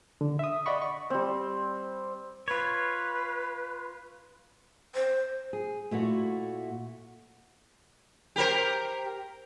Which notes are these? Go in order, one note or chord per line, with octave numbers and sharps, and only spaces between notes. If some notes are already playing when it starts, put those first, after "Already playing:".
D3
E5 D#6
D5 D#5 F#5 B5 C#6
C#6
G3 C4
F4 B4 C#5
C5
G#4
A#2 A3 E4 F#4
G4 A#4 C5